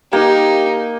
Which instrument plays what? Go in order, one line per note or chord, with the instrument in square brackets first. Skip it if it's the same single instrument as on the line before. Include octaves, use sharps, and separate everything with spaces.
[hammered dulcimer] A#3 [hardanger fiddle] D#4 [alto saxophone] G4